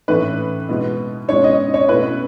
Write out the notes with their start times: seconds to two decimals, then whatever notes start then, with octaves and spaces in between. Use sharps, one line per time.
0.08 A2 E3 A3 C#4 B4
0.68 B2 G#3 B3 E4
1.28 B2 G#3 C#4 E4 C#5
1.44 D#5
1.74 C#5
1.89 B2 A3 C#4 E4 B4